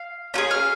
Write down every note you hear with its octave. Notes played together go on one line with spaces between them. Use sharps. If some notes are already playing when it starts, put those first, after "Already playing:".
Already playing: F5
C#4 F4 G#4
F5